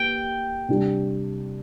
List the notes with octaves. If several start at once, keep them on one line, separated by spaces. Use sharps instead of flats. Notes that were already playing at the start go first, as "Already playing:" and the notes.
Already playing: A#3 G4 G5
C3 G3 D4 G4